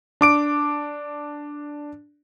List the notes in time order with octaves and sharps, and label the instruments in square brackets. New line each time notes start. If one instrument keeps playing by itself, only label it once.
[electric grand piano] D4 D6 D7